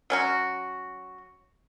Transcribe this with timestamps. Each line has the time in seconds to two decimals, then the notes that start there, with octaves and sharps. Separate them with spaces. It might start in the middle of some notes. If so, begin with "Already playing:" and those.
0.10 F#3 C#4 F#4